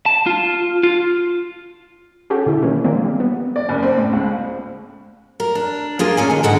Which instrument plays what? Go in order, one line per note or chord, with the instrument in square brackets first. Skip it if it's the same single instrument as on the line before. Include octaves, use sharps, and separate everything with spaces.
[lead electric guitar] A5
F4
F4
[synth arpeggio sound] C#4 F#4 G4 A4
B2 D3 E4
D#3 E3 A#3 C#4
F3 G#3 A#3 C4 D4
G3
B3
[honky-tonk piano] D5
F#1
C4
A2
C#2
[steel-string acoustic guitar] A#4
D4
A#3 F4 G#4
A#2 C#4 G#5
D3 D#3
G#2 D3 G#3 F#5